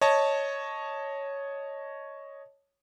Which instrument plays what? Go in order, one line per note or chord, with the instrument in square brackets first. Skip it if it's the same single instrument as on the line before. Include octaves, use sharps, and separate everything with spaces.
[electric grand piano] C#5 D#5 A5